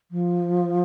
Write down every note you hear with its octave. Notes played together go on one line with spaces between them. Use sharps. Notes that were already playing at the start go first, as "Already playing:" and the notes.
F3